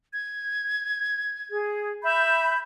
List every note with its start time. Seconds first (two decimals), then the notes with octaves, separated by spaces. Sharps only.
0.13 G#6
1.50 G#4
2.04 E5 B5 G6